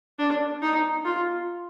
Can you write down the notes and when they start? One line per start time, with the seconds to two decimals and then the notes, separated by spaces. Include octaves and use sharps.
0.19 D4
0.62 D#4
1.05 F4